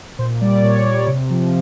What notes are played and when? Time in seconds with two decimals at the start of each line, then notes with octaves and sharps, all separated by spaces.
0.19 A#2 C5
0.41 G3 D5
0.63 A#2 C#5
0.85 G3
1.07 C3
1.30 F3